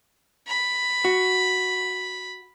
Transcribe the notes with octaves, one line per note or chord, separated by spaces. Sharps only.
B5
F#4